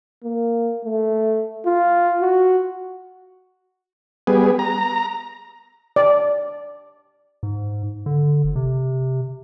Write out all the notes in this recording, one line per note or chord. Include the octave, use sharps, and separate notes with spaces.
A#3
A3
F4
F#4
G3 B3 G#4
A#5
D5
G#2
D3
G1
C3